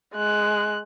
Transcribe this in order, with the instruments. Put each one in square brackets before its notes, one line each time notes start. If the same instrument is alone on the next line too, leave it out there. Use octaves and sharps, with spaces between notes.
[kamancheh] G#3 F#6